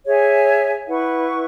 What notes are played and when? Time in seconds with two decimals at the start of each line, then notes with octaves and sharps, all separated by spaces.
0.07 G#4 C#5 E5 G#5
0.88 E4 B4 F#5 C#6